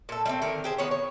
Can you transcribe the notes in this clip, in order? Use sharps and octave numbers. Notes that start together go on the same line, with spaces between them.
A#2 A4
G3 A3 C4
D3 D#3 A#4
G4 G#4 C5
D#3 B3 B4 C#5
C#5